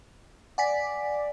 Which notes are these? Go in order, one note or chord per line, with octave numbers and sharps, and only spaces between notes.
D5 F#5 G#5 B6